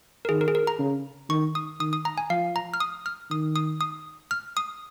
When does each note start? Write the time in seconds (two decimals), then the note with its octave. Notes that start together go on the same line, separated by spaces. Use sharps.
0.25 A#4
0.29 D#3 G#4
0.41 A#4
0.48 G#4
0.55 A#4
0.67 A#5
0.79 C#3
1.29 D#3 C#6
1.55 D#6
1.80 D#3 D#6
1.93 D#6
2.05 A#5
2.18 G#5
2.30 F3 F5
2.56 A#5
2.74 F6
2.80 D#6
3.06 F6
3.30 D#3 D#6
3.56 D#6
3.81 D#6
4.31 F6
4.57 D#6